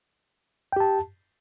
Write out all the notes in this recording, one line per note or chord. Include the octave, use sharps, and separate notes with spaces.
G4 G5 A5